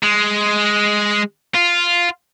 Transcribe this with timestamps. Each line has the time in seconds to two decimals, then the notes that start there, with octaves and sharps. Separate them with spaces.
0.03 G#3
1.55 F4